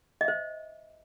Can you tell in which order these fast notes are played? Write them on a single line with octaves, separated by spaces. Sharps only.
D#5 E5 C5